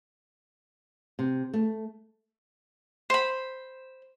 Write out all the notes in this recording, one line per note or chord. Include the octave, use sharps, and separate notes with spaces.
C3
A3
C5 B5